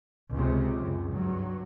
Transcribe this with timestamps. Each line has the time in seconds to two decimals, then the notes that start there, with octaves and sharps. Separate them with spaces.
0.34 C#2 C3
0.79 C#2 F#2
1.10 G2 F#3